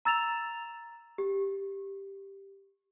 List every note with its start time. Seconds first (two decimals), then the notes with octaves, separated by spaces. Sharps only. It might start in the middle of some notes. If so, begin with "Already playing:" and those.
0.05 A#5 E6 A6 E7 F7
1.18 G4